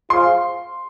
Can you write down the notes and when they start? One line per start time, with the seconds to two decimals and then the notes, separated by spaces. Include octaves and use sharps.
0.10 F4 G#4 C5 F5 C6